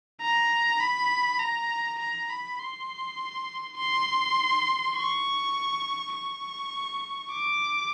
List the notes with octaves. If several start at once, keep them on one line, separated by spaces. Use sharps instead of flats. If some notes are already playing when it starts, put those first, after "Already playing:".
A#5
B5
A#5
A#5
B5
C6
C6
C#6
C#6
D6